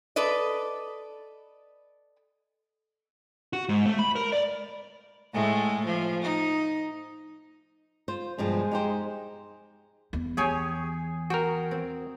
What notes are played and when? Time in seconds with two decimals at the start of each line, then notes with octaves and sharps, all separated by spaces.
0.16 A4 B4 D5 D#5
3.53 F#4
3.69 G#2
3.86 A3
3.99 B5
4.16 A#4
4.32 D5
5.34 A2 G#3 A3
5.85 F3
6.22 D#4
8.08 F4 C5
8.38 G2 B2 F3 G#3
8.71 D#4 G4 C5
10.13 E2
10.37 G4 G#4 C#5 G#5
11.30 F#4 A#4 G5
11.71 C4